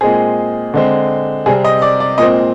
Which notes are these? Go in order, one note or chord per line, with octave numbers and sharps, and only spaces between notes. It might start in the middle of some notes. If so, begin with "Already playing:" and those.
A#2 G#3 C4 G#4
D3 G#3 C4
C3 G3 C4 G#4
D#5
D5
D5
A#2 G#3 C4 D#5